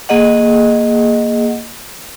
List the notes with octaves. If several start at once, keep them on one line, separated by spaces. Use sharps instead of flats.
A#3 G#4 D#5 F#5